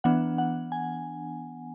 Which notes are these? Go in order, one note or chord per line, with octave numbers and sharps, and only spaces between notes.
E3 B3 D4 F#5
F#5
G#5